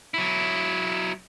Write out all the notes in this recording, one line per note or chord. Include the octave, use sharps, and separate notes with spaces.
F#3 E4